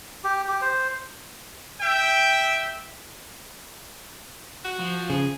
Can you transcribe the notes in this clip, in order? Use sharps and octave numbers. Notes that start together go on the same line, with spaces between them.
G4
G4
C5
E5 G5
F#4
F3
C#3 G#4